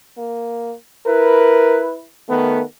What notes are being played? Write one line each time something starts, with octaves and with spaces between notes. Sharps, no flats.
A#3
E4 A#4 B4
D#3 A3 B3